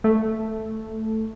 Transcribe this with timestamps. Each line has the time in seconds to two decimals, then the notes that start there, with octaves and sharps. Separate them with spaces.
0.04 A3